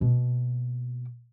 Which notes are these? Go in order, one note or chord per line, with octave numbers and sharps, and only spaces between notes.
B2 A#3